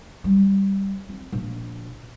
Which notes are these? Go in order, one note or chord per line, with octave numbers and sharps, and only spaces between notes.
G3
C4
A#1